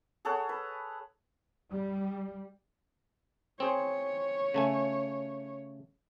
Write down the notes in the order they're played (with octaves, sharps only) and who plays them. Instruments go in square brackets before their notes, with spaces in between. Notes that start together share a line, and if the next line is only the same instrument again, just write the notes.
[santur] G#4 A4 C#5 F#5
B4
[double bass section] G3
[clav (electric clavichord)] C4 G#4 C5 [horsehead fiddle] C#5
[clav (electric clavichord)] C#3 A3 G#5